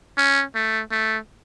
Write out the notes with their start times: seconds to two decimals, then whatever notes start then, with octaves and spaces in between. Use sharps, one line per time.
0.18 C#4
0.55 A3
0.92 A3